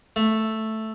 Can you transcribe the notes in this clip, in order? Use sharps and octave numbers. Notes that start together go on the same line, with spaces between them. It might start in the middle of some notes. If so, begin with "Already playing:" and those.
A3